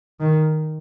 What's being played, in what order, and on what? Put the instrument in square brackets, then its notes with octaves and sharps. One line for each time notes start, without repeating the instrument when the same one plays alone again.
[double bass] D#3